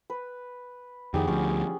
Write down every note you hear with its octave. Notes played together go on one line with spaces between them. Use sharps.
B4
F2 D#3 G4 G#4 F#5
D2 F3 C#4